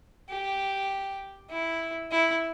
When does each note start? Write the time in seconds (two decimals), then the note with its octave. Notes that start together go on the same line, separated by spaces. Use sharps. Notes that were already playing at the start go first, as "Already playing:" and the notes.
0.29 G4
1.50 E4
2.11 E4